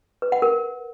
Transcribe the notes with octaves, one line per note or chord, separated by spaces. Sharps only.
B4
F#5
A#4